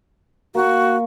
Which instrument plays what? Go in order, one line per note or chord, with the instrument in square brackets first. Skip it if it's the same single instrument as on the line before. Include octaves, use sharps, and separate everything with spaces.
[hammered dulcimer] A#3 C#6 [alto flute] F#4